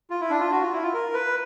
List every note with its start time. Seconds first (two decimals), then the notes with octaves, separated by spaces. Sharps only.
0.10 F4
0.21 E4
0.30 D4
0.40 F4
0.52 F#4
0.62 F4
0.73 E4
0.83 F4
0.93 A#4
1.14 B4